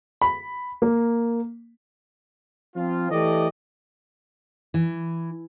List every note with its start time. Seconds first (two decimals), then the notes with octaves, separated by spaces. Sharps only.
0.22 B5
0.82 A#3
2.75 F3 C4 F4
3.10 E3 A3 G4 A4 D5 D#5
4.74 E3